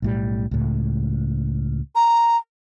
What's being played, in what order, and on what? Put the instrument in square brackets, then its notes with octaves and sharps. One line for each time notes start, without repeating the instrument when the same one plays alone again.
[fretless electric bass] B1 A2 G3
C#2 A2
[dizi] A#5